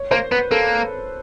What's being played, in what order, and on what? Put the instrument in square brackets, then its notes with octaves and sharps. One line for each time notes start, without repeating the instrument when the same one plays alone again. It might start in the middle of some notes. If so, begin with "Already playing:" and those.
Already playing: [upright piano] C#5
[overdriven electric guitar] A#3 [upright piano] C5
[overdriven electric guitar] B3 [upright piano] B4
[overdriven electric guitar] A#3 [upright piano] A4